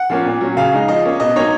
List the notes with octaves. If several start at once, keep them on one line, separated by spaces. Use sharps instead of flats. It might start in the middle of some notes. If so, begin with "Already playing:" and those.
Already playing: F#5
F3 A#3 C#4
A#2
F#3 C#4
C#3 F5
G#3 D#4
F3 D#5
A#3 C#4
B2 D#5
F#3 A#3 D#4 C#5